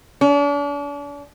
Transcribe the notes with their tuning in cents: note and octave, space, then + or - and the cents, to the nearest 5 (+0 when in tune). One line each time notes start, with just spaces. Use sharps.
D4 -40